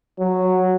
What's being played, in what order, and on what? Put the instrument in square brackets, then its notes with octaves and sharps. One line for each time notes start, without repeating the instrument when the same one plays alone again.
[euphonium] F#3